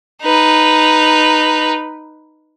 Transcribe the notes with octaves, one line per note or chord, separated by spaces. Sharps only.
D#4 B4